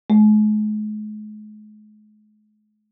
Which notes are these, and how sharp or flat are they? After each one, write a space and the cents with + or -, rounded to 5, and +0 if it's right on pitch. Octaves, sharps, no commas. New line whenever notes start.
G#3 +40